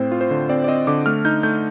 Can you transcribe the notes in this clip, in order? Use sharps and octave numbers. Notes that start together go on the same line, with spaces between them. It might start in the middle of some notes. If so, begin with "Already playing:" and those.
Already playing: A2 C4 C5
F4
C5
D3
C4 D5
D5
C4 D#5
D3 D6
A3 F6
D#4 G6
A3 G6